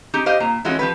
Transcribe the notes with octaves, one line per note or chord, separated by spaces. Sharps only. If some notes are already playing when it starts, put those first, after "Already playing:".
D#4 G4 G#4
G4 C5 D#5 F5
A#2 A#5
E3 G#3 A3 C#4 F4 F#4
F3 G4 B4